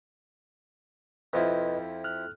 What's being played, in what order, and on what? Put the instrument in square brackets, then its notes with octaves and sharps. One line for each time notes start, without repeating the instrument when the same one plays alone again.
[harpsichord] F2 F3 E4 [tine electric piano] B4 D#5
[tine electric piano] F6 F#6